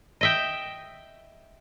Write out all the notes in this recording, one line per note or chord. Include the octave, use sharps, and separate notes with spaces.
D#5 E5 G5